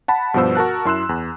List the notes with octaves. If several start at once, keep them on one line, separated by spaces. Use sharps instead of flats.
F#5 A5 B5
G2 B2 F3 B3 C5 E6
F#4 A#4 A5 F#6
F#2 E4 C6 E6 F#6 E7
E2